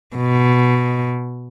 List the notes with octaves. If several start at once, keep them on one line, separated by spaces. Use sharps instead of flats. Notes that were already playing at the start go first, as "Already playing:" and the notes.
B2